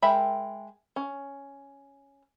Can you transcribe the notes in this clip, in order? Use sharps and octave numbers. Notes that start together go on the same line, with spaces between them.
G#3 A#4 E5 G5 B5
C#4